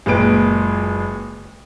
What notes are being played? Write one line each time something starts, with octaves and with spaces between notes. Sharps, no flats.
F#1 A#2 G#3 B4 D7